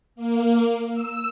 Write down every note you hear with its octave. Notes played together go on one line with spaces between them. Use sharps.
A#3
E6